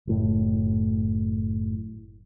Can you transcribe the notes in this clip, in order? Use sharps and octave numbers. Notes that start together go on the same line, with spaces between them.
F#1 A2